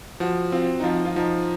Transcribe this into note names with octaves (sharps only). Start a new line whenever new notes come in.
F3 F#4
C4 F4
D#4
F3 F4
F4
F3 D#4